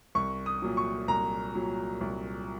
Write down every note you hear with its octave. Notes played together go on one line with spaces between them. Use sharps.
C2 C#6
D#6
A#2 F#3
C#6
C2 A#5
A#2 F#3
C2